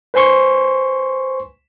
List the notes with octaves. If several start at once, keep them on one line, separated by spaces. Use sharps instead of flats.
B4 C5 G#5 C6 C#6